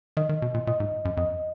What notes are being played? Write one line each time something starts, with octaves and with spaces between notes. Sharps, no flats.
D#3 D#5
D#3
B2
A#2
A#2 D#5
G#2
F#2
F2 D#5